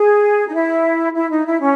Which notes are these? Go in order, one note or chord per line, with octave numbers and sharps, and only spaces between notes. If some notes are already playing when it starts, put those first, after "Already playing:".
Already playing: G#4
D#4
E4
E4
D#4
E4
C#4